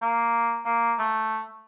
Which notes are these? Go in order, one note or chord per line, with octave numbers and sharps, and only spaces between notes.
A#3
A#3
A3